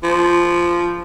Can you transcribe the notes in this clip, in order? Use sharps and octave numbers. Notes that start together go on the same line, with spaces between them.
F3